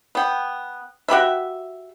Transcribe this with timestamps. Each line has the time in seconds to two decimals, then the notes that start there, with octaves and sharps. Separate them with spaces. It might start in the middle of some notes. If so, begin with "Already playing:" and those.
0.15 B3 G5
1.08 F#4 G4 B4 E5